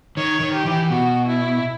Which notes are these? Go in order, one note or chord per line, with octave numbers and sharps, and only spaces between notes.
D#3 C#5
D#3
G4
E3
B2 F#4
E4